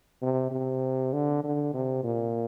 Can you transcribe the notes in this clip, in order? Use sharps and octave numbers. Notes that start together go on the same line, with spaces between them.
C3
C3
D3
D3
C3
A#2